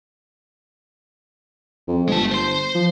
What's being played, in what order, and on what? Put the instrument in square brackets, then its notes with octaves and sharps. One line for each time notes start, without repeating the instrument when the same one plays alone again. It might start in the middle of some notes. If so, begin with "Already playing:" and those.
[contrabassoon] F2
[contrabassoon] G1 [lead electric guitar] G#3 A5
[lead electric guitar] C5 C6
[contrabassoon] F3